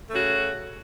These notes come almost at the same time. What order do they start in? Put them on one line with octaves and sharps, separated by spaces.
A3 C#3 F#4